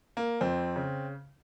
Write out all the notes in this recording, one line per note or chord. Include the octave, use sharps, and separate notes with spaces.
A#3
F2 C4
C#3